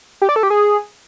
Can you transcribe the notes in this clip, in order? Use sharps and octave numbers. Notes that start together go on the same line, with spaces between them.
G4
D5
A4
G4
G#4